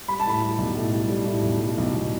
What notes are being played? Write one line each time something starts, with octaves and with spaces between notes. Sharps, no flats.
G3 B5
A5
A2 B5
G3
B1
A2
G3
G3
A2
B1
G3
B1
B1